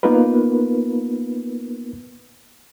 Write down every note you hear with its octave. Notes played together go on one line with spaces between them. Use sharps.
A#3 B3 D#4 F4 A#4 B4